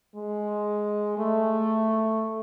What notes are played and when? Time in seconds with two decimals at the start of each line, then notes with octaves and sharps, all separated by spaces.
0.15 G#3
1.18 A3